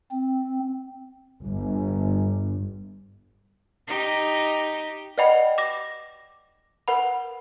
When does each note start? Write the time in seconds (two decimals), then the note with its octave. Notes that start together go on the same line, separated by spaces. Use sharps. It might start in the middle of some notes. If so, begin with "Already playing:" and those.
0.11 C4
1.41 G1
3.87 D#4 G4
5.18 B4 D5 D#5 F#5 G5 B5
5.58 D6 A#6
6.88 A#4 B4 F#5 B5